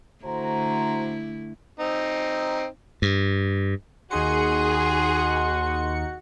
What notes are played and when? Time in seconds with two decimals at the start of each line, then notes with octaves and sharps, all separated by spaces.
0.24 D3 A3 E4 F#4 C5 A#5
1.80 C4 D#4
3.02 G2
4.11 D#2 D#4 F#4 G#4 C6 C#7